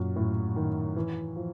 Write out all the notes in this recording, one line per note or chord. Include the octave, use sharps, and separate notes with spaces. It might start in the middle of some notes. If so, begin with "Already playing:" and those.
Already playing: F#2 A#2
A2
D#3
E3
F3